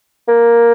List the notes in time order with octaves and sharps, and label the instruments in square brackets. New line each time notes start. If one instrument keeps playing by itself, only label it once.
[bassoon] A#3